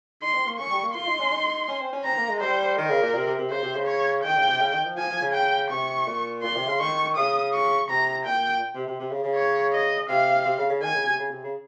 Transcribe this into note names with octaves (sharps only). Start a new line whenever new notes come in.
D#4 C6
C4
A#3
C#4 C#6
G3
A#3
F4 C6
D#4
C#4
D#4
C#4
C4
C#4
C4 A#5
A#3
G#3
G3 C5
D#3 A#4
C#3
A#2
C3
C3
C3
C#3 C5
C3
C#3
C#5
D#3 G5
C#3
C3
C#3
D#3
F3
F3 G#5
F3
C#3
G5
C3 C#6
A#2
A#2 C6
C3
C#3
D#3 C#6
C#3 D#6
C#6
C3 A#5
A#2 G5
C3
C3
C3
C#3
C#3
C#5
D#5
C3 F5
C3
C#3
C#3
D#3 G#5
C#3
C3
C#3
C3
C#3